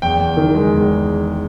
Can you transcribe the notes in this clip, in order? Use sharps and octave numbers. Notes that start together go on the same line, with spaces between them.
E2 G5
E2
D#3
G#3
E2